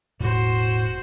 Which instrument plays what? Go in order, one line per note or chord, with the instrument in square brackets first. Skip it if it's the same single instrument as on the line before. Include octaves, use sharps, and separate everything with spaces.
[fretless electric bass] E1 [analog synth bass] A2 [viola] F#4 C5